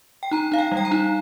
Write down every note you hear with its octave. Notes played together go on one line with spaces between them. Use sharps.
G5
D#4 A#5
D#4 F5
G5
G3
G5
A#5
D#4